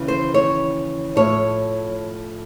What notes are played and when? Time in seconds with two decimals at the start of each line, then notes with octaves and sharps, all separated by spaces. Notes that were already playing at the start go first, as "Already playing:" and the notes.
Already playing: D#2 C#3 E3
0.08 C5
0.34 C#5
1.16 A2 F3 C#5